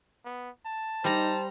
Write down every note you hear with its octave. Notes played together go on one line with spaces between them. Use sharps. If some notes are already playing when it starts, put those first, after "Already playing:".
B3
A5
G3 D#4 C5 A#5